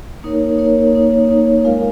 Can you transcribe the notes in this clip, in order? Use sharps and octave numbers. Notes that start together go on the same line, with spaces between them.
A#3 D#4 A#4 C#5
A#3 D#4 A#4 C#5
A#3 D#4 C#5
A#3 D#4 C#5
G#3 F4 A#4 F5